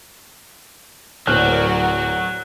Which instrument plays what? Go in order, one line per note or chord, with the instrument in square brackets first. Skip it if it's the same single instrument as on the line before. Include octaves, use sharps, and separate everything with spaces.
[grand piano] D1 C5 F6 [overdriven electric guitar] F#3 [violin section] F#4 A#4 D5 [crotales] F#6